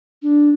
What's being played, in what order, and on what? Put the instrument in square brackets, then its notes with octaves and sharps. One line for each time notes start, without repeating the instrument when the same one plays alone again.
[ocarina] D4